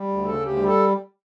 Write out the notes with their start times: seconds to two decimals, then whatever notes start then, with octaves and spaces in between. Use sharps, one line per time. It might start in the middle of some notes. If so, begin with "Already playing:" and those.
Already playing: G3
0.09 D2
0.24 C#3 A4
0.41 D2
0.46 G4
0.56 G3
0.67 A4